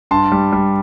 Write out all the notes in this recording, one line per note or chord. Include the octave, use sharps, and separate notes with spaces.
G2 A5 C6
G3
G3